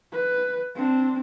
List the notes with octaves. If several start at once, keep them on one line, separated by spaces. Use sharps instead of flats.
B4
C4 D4